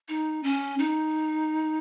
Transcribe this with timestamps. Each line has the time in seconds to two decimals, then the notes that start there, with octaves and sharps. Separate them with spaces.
0.09 D#4
0.43 C#4
0.79 D#4